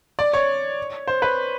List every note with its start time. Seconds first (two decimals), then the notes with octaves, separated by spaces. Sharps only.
0.19 D5
0.33 C#5
1.08 C5
1.22 B4